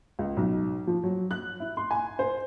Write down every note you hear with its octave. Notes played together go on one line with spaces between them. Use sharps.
C#2
B1
F3
F#3
F#6
E4
C6
G#5
C5